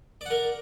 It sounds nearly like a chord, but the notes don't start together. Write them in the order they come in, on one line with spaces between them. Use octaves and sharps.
D5 F#5 A#4